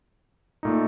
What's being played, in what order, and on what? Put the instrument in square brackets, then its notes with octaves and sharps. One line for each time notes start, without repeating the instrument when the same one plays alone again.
[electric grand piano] A#2 A3 D#4